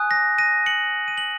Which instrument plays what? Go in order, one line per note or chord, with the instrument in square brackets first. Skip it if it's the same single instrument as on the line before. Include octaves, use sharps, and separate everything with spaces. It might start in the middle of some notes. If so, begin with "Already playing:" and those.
Already playing: [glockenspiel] G#5 D#6 F#6
A#6
A#6 D#7
C#7 F#7
D#7
F#7